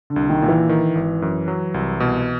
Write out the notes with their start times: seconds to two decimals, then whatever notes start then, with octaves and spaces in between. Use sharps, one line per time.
0.10 D3
0.16 C2
0.29 D#3
0.42 A#2
0.49 E3
0.69 D#3
0.95 G#1
1.22 F#2
1.48 F#3
1.74 C2
2.00 B2